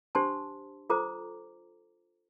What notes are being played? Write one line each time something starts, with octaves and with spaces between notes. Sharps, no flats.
D4 G4 C5 A5 C6
F4 A4 C5 A#5 D6